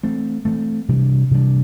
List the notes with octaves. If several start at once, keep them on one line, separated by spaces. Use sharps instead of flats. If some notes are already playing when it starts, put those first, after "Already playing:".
E3 A3 C4
E3 A3 C4
C3 E3 G3 D4
C3 E3 G3 D4